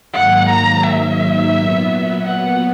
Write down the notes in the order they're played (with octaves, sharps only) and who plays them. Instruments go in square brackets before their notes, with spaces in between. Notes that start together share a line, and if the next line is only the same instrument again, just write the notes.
[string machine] G#2 D#3 F#3 A#3 [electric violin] F#5
[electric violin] A#5
E5
[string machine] A#2 F#3 B3
[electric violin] F#5